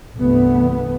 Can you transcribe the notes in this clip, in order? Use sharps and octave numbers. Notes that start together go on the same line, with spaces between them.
C2 G2 E3 A3 B3